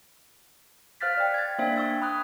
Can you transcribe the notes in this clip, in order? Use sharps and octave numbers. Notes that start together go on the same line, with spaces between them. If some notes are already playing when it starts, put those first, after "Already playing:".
C5 F5 F6 F#6 A6 B6
D5 G5
G#6 A6
A#3 D4 C5 E5 G5 B6
C#6 E6 G#6
B5 D#6 F#6